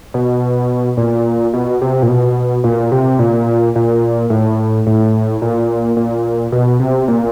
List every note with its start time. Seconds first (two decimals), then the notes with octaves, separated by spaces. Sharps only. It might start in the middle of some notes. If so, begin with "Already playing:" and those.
0.14 B2
0.97 A#2
1.54 B2
1.82 C3
2.02 A#2
2.09 B2
2.64 A#2
2.92 C3
3.19 A#2
3.76 A#2
4.30 A2
4.87 A2
5.42 A#2
5.97 A#2
6.52 B2
6.80 C3
7.08 A#2